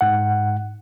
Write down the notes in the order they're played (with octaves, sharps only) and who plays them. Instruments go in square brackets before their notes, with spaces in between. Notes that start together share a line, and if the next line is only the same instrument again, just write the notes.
[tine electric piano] G#2 F#5